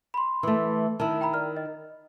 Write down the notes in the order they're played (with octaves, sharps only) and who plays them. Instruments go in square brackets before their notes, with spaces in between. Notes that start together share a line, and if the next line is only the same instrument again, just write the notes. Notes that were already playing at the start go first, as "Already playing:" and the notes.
[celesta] B5 C6
[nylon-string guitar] E3 A3
[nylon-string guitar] D#3 E4 [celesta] A5
[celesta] G5 A#5 B5
A#4 D5 F6
D#5